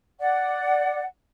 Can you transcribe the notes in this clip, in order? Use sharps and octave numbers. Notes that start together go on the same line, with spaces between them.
D5 F#5